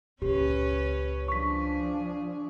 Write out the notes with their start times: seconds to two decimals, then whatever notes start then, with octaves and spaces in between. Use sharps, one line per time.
0.22 C#2 A#2 C#4 G4 B4 C#5
1.28 F3 D4 G#4 C#6 B6